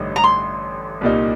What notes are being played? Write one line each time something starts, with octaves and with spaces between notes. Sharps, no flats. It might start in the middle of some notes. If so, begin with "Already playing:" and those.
Already playing: A1 G2 D3 A3 D#4
A#5
C6
C2 A#2 G3 A#3 D#4